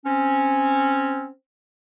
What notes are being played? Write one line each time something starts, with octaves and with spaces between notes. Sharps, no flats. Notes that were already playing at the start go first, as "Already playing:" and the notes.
C4 C#4